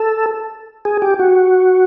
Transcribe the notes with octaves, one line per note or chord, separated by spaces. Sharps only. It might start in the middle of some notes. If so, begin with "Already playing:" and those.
Already playing: A4
G#4
G4
F#4